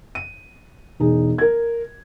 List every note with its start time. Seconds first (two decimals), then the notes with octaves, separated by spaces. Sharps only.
0.15 D#7
1.00 E1 D#4 G#4
1.38 A#4 G#6